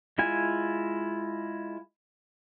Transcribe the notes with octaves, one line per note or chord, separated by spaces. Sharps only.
G#3 E4 F4 G#5